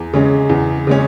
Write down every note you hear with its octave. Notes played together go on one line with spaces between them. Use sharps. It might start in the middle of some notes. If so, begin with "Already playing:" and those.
Already playing: E2
C#3 G#3 C#4
E2
C#3 G#3 C#4